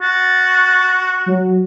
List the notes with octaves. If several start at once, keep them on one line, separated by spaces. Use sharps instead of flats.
F#4 A6
F#3